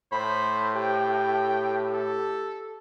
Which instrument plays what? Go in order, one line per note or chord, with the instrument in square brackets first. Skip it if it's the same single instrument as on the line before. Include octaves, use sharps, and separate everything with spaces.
[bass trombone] A2 [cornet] C5 [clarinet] B5
[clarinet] G4 [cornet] G5
[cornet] A4